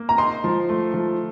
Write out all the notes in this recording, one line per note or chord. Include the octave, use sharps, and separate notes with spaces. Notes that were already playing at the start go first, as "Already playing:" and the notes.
Already playing: A#3
A#5
D#4 C6
F3
A3
F3